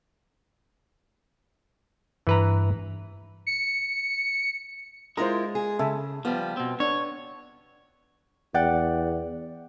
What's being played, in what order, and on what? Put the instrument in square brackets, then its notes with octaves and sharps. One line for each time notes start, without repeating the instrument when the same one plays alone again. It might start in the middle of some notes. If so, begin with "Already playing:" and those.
[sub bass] G2 [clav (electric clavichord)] E3 B4 A#5
[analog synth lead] C#7
[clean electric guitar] G#3 [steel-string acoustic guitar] E4 F4 A#4 [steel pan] C5 A#5
[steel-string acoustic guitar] G#4
[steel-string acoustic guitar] C#3 [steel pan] A4 E5 G#5
[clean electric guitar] F3 G3 [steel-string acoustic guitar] B3
[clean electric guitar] B2 C4
[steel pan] D4 [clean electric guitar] C#5
[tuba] E2 [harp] D5 F#5 G5